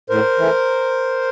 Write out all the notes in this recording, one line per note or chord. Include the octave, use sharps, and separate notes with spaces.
A2 A#4 C5
E3 A3